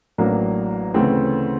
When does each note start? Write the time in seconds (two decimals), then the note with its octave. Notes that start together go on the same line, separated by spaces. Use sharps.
0.18 A1 A2 F#3 A#3 D4
0.94 D2 C#3 E3 A3 C4